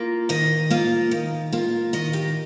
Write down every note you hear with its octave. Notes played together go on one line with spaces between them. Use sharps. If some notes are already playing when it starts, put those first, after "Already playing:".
Already playing: A#3 F4
D#3 D#5
A#3 F4
D#3
A#3 F4
D#3 D#5
G4